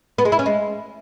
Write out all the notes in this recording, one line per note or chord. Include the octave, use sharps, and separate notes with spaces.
B3
G#3
E4
C#4
G#3